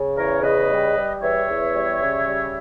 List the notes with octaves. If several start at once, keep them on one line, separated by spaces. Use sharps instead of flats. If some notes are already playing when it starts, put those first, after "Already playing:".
Already playing: C#3
E2 A#4 C#5
C#3 B4 D#5
G3
G3
E2 C#5 E5
E2
G3
C#3
G3